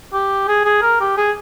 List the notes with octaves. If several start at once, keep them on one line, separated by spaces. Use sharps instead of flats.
G4
G#4
G#4
A#4
G4
G#4